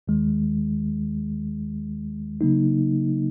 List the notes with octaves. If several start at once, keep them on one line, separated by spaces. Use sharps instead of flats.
D#2 D#3 G#3
C#3 F#3 A#3 D#4